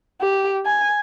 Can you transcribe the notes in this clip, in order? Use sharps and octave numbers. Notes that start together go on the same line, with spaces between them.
G4
G#5